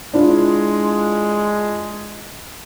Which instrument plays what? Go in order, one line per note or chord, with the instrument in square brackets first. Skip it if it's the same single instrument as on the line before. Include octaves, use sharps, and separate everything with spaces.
[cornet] G#3 [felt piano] D4 E4 F4